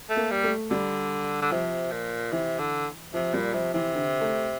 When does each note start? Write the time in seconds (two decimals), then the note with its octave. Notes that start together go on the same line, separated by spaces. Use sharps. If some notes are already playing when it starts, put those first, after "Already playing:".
0.10 A3
0.16 A#3
0.31 G3
0.44 A3
0.70 D3 G3
1.42 D3
1.51 C3 F3
1.91 A#2
2.32 C3 E3
2.59 D3
3.14 C3 F3
3.34 A#2 G3
3.53 C3 F3
3.74 C3 E3
3.95 D3
4.21 A3